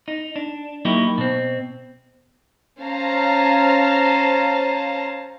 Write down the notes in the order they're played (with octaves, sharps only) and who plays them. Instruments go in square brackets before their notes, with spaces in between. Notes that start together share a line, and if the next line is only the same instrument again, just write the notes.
[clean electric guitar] D#4
D4
F#3 A#3 D#4 E4 G4
B2 C4
[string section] C#4 C5 F5 A5 A#5